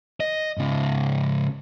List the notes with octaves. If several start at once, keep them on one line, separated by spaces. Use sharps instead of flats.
D#5
G#2 C#3